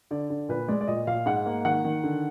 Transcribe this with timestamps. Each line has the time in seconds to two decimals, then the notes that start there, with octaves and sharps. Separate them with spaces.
0.11 D3 D5
0.30 D3
0.49 A#2 B4
0.68 G#3 D5
0.81 D5
0.88 A#2 D#5
1.07 A#2 F5
1.26 G#2 F#5
1.46 A#3
1.65 D#3 F#5
1.84 D#3
2.04 D3